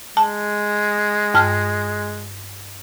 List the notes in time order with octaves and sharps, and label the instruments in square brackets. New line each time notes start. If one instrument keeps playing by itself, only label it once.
[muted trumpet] G#3 [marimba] A5
[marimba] G2 A5 F6